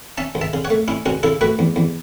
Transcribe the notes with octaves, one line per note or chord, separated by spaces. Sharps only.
C#4 E5 A5
C#2
E5 A5
C#3
C#5 F#5
A3
C#4 E4
C#2 C#4 F#4
C#3 E4 A4
A3 F#4 B4
E2
E2